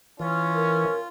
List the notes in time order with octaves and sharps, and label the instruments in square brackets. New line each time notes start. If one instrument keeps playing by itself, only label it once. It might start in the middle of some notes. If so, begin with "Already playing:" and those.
[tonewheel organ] E3 [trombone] C#4 [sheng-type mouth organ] F4
[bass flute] A#4